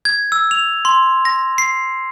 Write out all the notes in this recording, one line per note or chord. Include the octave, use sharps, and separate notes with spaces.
G#6
E6
F7
C6
A#6
C7